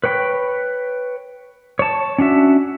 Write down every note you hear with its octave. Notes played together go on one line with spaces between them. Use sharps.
B4 C#5 G5 B5
C#5 A5
C#4 D4 F#4 E5